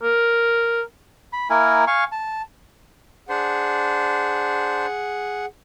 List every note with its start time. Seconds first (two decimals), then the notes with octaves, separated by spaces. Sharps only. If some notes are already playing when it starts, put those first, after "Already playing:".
0.03 A#4
1.33 B5
1.50 A#3 E4 A#4 G#5
1.87 F5 G#5 C#6
2.12 A5
3.29 D4 G#4 C5 F#5